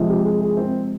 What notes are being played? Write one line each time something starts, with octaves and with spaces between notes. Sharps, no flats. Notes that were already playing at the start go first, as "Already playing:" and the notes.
Already playing: C3 F3 G#3
G4
G#4
G#4
C4